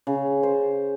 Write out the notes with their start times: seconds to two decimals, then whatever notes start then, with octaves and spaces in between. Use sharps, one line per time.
0.07 C#3
0.43 C5